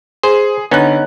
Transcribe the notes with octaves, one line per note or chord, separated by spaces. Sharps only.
G#4 C5
D3 B3 C#4 D#4 F#6